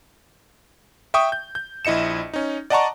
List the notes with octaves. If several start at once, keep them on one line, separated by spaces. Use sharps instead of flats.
E5 G5 C#6 D#6
G6
G6
A#1 E4 D#5 C#7 E7
C#4 D#4
D5 D#5 F#5 A5 A#5 C#6